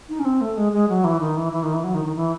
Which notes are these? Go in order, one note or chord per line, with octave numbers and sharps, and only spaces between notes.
D#4
C#4
C4
A3
G#3
G#3
F#3
E3
D#3
E3
E3
D#3
E3
F#3
D#3
D#3
E3